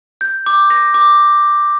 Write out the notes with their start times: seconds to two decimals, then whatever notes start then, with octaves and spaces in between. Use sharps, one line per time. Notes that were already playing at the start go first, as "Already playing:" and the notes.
0.21 G6
0.46 D6
0.70 A#6
0.94 D6